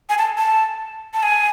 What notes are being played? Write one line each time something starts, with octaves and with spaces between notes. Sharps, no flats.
G#5
A5
A5
A5
G#5